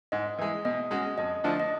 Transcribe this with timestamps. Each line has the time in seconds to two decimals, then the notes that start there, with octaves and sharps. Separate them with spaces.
0.12 G#2 D#5
0.39 E3 G#3
0.65 B2 D#5
0.91 G#3 C#4 F#4
1.18 F2 D#5
1.44 D3 F3 A3 D4
1.60 D#5